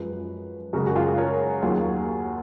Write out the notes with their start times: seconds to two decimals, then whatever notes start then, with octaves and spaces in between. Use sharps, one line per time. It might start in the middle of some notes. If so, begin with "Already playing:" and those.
Already playing: F#2 F3 G#3 B4
0.73 F#2 C#3 G#3 F#4 A#4
0.86 F#4
0.95 F4 G#4
1.18 A#4 C#5
1.62 D#2 D#3 F#3 F4 G#4